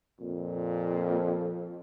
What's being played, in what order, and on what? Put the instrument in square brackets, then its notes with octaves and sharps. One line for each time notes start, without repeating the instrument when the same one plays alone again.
[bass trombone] F2 [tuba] A#2